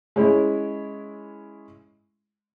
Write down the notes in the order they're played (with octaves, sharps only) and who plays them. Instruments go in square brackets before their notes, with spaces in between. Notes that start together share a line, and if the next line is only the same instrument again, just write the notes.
[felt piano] G#3 C#4 E4